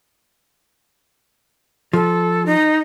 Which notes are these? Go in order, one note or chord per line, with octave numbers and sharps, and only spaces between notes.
F3 A4
D#4